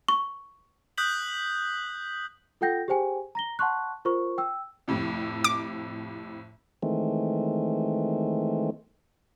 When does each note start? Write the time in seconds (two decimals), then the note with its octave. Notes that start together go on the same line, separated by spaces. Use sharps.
0.08 C#6
0.98 D#6 F#6 G6 B6 F#7
2.61 F4 A4 F#5 G5 G6 A#6
2.88 G4 G#4 C5 G5 G#5
3.35 A#5 A#6 G7
3.59 F#5 A5 C6 C#6 F#6
4.05 F4 A#4 C5 C#6
4.38 G5 E6
4.88 F2 A2 C3
5.44 D6
6.83 D#3 E3 G#3 A3 C4